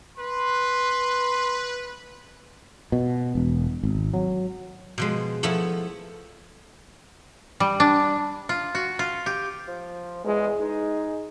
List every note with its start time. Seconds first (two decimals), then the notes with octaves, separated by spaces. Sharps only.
0.17 B4 C6
2.92 B2
3.35 E1
3.83 G#1
4.14 F#3
4.98 B2 F3 G#3
5.43 F3 A3 B3 E4
7.60 G3
7.80 D4
8.49 F4
8.75 F#4
8.99 F4
9.26 G4
9.68 F3
10.25 E2 G#3
10.60 G#3 D#4